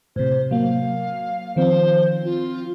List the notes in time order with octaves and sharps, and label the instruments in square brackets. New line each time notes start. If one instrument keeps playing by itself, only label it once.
[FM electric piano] A2 C3 [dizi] C5
[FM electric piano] F#3 A#3 [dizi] F5
[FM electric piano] D#3 F3 C4 [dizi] C5
[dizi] F4